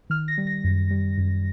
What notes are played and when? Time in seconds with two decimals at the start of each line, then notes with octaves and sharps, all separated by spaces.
0.10 D#3 F6
0.28 A#6
0.38 G3
0.47 A#6
0.64 F#2
0.91 G3
1.18 F#2